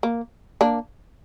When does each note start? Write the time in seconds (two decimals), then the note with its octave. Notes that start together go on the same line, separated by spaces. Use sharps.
0.03 A#3
0.61 A#3 D4